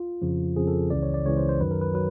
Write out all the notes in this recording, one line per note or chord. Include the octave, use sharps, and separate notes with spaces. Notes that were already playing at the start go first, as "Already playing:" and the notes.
Already playing: F4
F2 C#3 F3
F2 C#3 F3 G#4
A4
C#2 C#3 E3 D5
C#5
D5
C#2 C#3 E3 C#5
C5
C5
F#2 D#3 F#3 B4
A#4
B4
F#3 B4